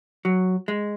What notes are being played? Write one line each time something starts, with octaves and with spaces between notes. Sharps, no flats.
F#3
G#3